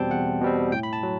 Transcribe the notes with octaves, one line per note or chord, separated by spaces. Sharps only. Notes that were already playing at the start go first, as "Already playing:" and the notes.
Already playing: E2 B2 G3 C4 G5 A5
E2 F#5
B2 G3 C4
A2 G5
B5
A5
F#3